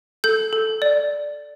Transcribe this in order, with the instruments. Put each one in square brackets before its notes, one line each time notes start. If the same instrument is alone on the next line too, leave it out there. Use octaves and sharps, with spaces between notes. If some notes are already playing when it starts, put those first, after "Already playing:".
[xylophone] A4 G6
A4
D5